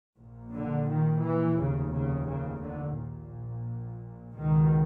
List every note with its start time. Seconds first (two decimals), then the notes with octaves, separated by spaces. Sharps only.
0.17 A#1 A#2
0.53 D3
0.87 D#3
1.22 E3
1.57 F1 D#2 C#3
1.91 C#3
2.26 C#3
2.60 D3
2.95 A#1 A#2
4.34 C#2 B2 D#3